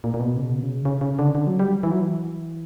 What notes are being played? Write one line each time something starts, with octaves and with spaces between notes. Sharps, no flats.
A#2
A#2
B2
C#3
B2
C#3
C#3
C#3
D3
D3
F#3
G3
E3
F#3
E3